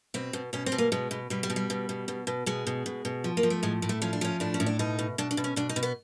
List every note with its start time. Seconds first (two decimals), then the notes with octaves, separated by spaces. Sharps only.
0.14 B2 C4
0.33 B2
0.53 B2 C#4
0.66 C4
0.72 B2
0.78 A#3
0.92 B2 G#3
1.11 B2
1.30 B2 G3
1.43 G3
1.50 B2
1.56 G3
1.70 B2
1.89 B2
2.08 B2
2.27 B2
2.46 B2 G#3
2.67 B2
2.86 B2
3.05 B2
3.24 F3
3.37 A#3
3.43 F3
3.50 A3
3.63 A2 G#3
3.82 A2
3.89 A3
4.02 F3 C#4
4.13 D4
4.21 F3 C#4
4.40 A2 D4
4.54 C#4
4.60 A2
4.66 D4
4.79 B2 D#4
4.99 B2
5.18 B2 D4
5.31 D4
5.37 B2
5.44 C#4
5.56 B2 D4
5.69 D#4
5.76 B2
5.83 B3